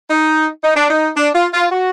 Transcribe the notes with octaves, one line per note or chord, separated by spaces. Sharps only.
D#4
D#4
D4
D#4
D4
F4
F4
F#4